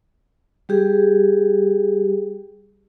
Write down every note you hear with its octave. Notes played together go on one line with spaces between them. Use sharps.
G3 G4 G#4